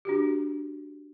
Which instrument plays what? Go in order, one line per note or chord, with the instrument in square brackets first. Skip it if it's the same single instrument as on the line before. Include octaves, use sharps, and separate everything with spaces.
[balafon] D4 F#4 G4